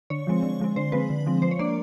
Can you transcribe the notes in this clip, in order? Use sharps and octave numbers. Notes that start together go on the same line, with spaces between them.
D3 C#5
F3 G#3 C4
D3
F3 G#3 C4
D3 C5
F3 G#3 C4 B4
D3
F3 G#3 C4
F3 C5
C#5
A#3 D4 D5